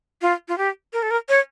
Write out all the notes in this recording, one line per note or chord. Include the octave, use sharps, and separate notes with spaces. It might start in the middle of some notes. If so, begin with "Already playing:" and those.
F4
F4
G4
A#4
A4
A#4
C#5